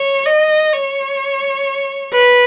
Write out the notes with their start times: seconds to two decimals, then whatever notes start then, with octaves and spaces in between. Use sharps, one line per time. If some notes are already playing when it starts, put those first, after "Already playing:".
Already playing: C#5
0.26 D#5
0.73 C#5
2.12 B4